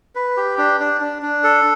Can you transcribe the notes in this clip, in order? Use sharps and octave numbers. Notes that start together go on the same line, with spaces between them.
B4
G4
D4
D4
D4
D4
A4